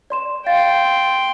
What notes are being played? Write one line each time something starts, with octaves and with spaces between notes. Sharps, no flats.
D5 C6 E7
F5 G5 C6 A6